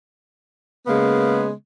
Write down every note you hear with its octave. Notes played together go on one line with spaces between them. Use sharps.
C#3 G#3 A#3 B3